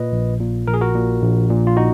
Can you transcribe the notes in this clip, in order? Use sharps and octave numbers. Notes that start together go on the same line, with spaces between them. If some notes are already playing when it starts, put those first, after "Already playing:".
Already playing: A#2 B4 D#5
A#1
A#2
A#1 A#4
G#4
F#4 A#4
A#2
A#1
A#2
F4
D#4 F#4